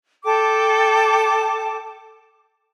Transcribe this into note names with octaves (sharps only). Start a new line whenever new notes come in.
A4 G5 A5 D6